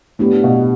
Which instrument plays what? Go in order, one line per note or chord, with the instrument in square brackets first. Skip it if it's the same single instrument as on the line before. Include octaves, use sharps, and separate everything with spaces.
[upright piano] A2 [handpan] B3 D4 G4
[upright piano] B2